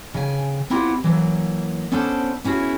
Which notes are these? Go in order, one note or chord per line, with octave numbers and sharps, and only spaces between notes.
C#3 G5 G#5
B3 C4 E4 F4 G4 F#5
E3 F#3 A#3
B3 C#4 D4 A4 C5
B3 C#4 E4 F#4 G#4